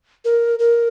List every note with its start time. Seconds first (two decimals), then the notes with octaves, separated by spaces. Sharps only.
0.25 A#4
0.59 A#4